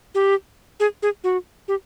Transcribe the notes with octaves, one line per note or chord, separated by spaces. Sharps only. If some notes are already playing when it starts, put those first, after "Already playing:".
G4
G#4
G#4
F#4
G4